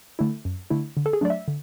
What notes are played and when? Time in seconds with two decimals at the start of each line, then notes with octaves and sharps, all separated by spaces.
0.19 D3 A3 E4
0.45 F#2
0.70 D3 A3 E4
0.97 D3
1.06 A4
1.13 G#4
1.21 F#3 A3 D4 D5
1.30 E5
1.48 D3